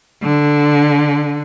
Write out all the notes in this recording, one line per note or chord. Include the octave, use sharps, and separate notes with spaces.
D3